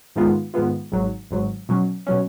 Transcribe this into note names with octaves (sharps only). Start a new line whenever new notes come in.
G#2 D#3 G#3 B3 F4
G#2 D#3 G#3 B3 F4
G#1 G#2 F#3
G#1 G#2 F#3
B2 F#3 C#4
B2 F#3 C#4